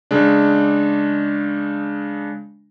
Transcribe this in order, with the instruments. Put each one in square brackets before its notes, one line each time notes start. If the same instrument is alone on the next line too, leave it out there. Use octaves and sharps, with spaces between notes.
[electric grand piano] C#3 G#3 D4